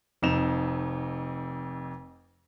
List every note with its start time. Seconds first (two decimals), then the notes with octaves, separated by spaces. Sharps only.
0.22 F1 F2 D#4 E7 F7